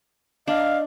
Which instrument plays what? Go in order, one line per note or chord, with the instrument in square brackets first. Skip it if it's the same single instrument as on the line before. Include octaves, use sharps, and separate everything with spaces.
[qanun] D4 [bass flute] D#5 [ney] F5